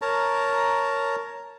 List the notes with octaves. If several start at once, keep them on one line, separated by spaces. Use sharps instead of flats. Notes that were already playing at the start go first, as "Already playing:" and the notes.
A#4 C#5 A5 A#5